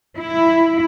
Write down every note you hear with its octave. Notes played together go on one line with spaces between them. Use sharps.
E4